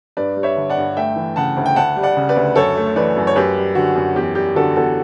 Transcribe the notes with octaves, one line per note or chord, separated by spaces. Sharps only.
G2 B4 D5
G3
C#5 E5
D3
D5 F#5
G2
A3 E5 G5
E3
C#3 F#5 A5
D2
G5
D2 F#5 A5
G3
D5 F#5
C#3
B4 D5
D2
F#2 A4 C#5
A3
E3 B4 D5
F#2
C#5
F#2 G4 B4
G3
D3 F#4
F#2
E2 G4
G3 G4
D3 F#4 A4
E2 F#4 A4